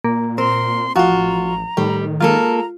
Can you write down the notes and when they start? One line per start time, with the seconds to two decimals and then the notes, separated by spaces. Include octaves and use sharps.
0.04 A#2 A#3
0.38 C4 A#4 C6
0.96 A1 F3 F4 F#4 A#5
1.77 A2 D#3 G3
2.21 G#3 A#3 F4 A4 A#5